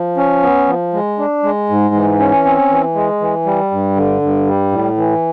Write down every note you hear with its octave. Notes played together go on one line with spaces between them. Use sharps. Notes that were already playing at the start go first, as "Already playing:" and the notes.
Already playing: F3
C#4
B3
F3
G#3
D4
G#3
G#2
E3
C#4
C4
E3
G#3
E3
G3
G2
D3
G2
G3
A2
E3